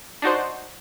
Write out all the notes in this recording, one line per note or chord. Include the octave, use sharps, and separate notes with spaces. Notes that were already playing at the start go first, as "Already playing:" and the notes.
D4 D#4 F#4 C5